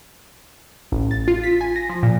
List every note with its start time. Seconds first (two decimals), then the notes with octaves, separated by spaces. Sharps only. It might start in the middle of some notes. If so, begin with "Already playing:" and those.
0.92 A1
1.11 A6
1.28 F4
1.44 B6
1.61 G#5
1.76 A#6
1.89 F3
2.03 A#2